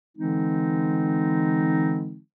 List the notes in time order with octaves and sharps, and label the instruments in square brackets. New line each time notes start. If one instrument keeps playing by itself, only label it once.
[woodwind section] D3 E3 G#3 C4 D#4